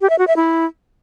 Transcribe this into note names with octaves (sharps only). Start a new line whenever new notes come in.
G4
E5
F#4
E5
E4